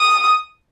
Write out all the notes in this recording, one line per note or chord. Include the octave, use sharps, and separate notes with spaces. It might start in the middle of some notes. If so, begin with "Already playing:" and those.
Already playing: D#6